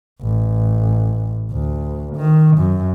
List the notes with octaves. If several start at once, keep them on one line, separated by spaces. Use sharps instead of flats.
A1
D2
D#3
F#2